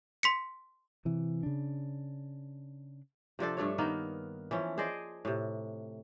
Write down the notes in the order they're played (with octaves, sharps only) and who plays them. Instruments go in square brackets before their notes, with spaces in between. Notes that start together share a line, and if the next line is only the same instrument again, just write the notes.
[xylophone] C6 B6 C#7
[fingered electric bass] C3 E3
C#3 D4
[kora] C3 F3 D4 A4
G2 A3 D4 C#5
D#3 A#3 B3 D#4
E3 F3 C#4
G#4 C5 D5 D#5
A2 C3